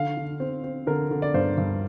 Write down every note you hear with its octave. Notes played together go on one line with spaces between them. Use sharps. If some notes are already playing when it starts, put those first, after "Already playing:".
Already playing: D3 F5
D3
C4
C4
D3 A#4
D3
D5
G2 C5
G2